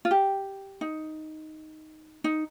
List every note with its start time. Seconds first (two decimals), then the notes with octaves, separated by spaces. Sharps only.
0.05 F4
0.11 G4
0.81 D#4
2.24 D#4